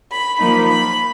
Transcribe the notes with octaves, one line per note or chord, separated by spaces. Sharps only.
B5
F3 A#3 D#4 B5
B5